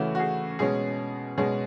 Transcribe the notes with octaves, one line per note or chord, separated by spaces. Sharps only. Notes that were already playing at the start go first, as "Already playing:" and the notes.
Already playing: C#3 E3 A3 C#4 E4 F#4
F#4
G#4
B2 G#3 C#4 G#4
B2 G#3 C#4 G#4